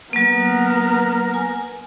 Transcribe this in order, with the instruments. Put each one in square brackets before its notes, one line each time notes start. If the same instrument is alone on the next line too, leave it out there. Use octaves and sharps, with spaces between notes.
[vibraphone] F#3 A#3 [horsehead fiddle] B3 A#4
[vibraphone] G#5